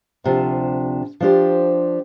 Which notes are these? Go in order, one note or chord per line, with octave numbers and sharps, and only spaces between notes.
D2 C3 F3 D4
F3 D4 G4 C5